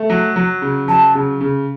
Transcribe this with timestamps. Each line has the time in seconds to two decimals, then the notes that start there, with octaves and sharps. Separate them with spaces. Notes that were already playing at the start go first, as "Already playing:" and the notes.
Already playing: A3
0.10 F#3
0.36 F#3
0.62 C#3
0.88 F#3 A5
1.15 C#3
1.41 C#3